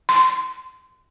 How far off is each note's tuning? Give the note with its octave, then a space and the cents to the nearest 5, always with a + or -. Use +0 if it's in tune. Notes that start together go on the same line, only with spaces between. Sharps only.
C6 -25